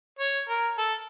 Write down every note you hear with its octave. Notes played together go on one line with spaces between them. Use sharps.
C#5
A#4
A4